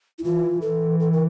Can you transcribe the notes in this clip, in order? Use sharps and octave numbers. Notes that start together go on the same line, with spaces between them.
E4
E3 F4
E3 A4
A4
A#4